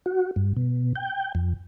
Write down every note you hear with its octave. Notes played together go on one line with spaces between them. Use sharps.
F#4
G2
B2
G5
F2